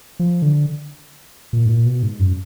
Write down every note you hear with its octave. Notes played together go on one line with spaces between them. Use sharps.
F3
D3
A#2
G#2
A#2
B2
G#2
F#2